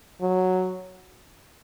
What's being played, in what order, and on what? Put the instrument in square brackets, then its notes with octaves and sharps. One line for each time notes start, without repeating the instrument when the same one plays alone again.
[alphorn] F#3